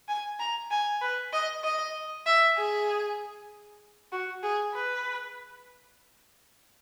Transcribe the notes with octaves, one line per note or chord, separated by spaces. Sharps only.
G#5
A#5
G#5
B4
D#5
D#5
E5
G#4
F#4
G#4
B4